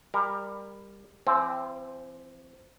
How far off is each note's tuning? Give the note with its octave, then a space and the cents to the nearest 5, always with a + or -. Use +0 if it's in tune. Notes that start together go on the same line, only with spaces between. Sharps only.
G3 +20 A#4 +0
E3 +45 C4 +0